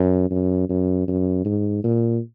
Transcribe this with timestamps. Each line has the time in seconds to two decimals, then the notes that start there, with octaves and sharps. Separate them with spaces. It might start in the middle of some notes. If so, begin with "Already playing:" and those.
Already playing: F#2
0.31 F#2
0.69 F#2
1.08 F#2
1.45 G#2
1.84 A#2